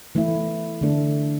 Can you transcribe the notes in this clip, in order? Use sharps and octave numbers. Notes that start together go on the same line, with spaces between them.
E3 A3 E4
D3 A3 D4 A4